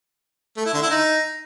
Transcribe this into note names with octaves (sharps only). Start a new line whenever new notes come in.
A3
E4
D3
E4
D#4